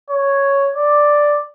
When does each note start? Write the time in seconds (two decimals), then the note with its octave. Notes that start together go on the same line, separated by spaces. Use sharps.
0.10 C#5
0.76 D5